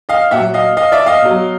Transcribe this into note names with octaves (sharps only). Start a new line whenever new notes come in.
D#5 F5
A#2 F#3 E5 F#5
D#5 F5
D#5 F5
D5 E5
D#5 F5
B2 F#3